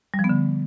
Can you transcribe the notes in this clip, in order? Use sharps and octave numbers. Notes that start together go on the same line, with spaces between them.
G3
F3
B3
D3